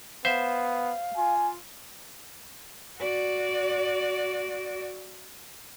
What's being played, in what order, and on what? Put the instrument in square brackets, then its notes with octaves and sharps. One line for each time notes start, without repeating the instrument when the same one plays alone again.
[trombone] B3 [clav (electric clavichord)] C5 E5 [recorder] F5
[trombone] F4 [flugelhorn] G#5
[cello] F#4 D5